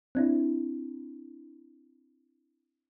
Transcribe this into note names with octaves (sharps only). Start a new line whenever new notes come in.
C4 D4 E4